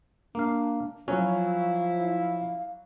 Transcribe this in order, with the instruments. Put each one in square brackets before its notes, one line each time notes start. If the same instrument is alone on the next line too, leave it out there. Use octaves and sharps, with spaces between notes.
[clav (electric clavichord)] A#3 F5 [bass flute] D4
[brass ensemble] F3 E4 [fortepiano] F#3 [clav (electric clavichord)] C#4 [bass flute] F5